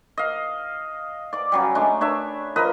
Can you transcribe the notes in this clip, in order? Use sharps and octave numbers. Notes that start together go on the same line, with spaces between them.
D#5 F5
D5 D6
C#3 F#3 G3
G#3 A3 D4
D4 C#5 E5
F3 A#4 B4 D#5